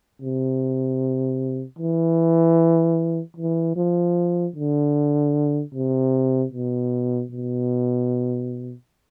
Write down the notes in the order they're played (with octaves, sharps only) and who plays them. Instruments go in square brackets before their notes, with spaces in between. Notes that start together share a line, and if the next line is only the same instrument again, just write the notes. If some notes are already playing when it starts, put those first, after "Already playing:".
[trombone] C3
E3
E3
F3
D3
C3
B2
B2